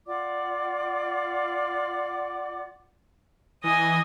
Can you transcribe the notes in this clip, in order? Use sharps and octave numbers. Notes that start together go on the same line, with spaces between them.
F4 D5 F#5 D6
E3 D#5 G#5 D#6